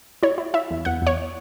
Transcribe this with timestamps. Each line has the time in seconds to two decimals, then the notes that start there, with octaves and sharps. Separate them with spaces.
0.23 E4 C#5
0.38 E4
0.54 E4 E5
0.71 E2
0.85 E2 F#5
1.02 E2 C#5